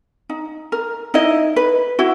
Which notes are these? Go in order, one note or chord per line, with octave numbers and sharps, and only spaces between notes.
D#4
A#4
D#4 E4 D#5
B4
E4 F#4